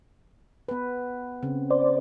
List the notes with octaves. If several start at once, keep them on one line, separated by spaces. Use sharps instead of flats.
B3 B4
C#3 C4
C5 D5